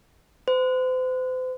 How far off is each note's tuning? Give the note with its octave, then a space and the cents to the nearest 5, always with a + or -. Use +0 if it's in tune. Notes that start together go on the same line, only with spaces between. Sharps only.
C5 -40